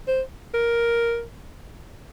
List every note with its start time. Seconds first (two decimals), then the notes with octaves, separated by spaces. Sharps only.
0.08 C5
0.54 A#4